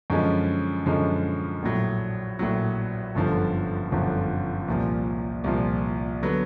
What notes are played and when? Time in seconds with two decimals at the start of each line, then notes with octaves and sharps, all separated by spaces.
0.10 F#2 D3 F3 G#3 C#4
0.86 F#2 D3 F3 G#3 C#4
1.63 A#1 A2 F#3
2.39 A#1 A2 F#3
3.15 G1 F#2 D3 F3
3.91 G1 F#2 D3 F3
4.68 C2 A#2 F3
5.44 C2 A#2 F3
6.22 D3 F#3 B3